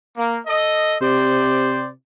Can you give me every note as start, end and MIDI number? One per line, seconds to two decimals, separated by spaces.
0.17 0.38 58
0.46 0.96 69
0.46 0.96 75
1.02 1.92 48
1.02 1.87 67
1.02 1.87 72
1.02 1.87 74